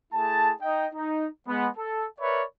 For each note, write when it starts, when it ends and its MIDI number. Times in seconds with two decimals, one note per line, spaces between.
0.13 0.53 57
0.13 0.53 64
0.13 0.53 68
0.13 0.53 81
0.62 0.86 63
0.62 0.86 75
0.62 0.86 79
0.94 1.27 63
1.47 1.68 56
1.47 1.68 59
1.77 2.05 69
2.20 2.43 70
2.20 2.43 71
2.20 2.43 73
2.20 2.43 74
2.20 2.43 76
2.20 2.43 83